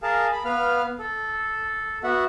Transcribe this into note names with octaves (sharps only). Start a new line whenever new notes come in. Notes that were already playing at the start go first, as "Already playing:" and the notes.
G#4 A#4 F5 A5
B5
B3 B4 F5 F6
A4
B3 F#4 E5 F#5